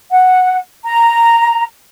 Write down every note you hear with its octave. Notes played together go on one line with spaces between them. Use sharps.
F#5
A#5